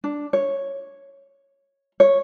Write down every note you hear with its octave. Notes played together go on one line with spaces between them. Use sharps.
D4
C#5
C#5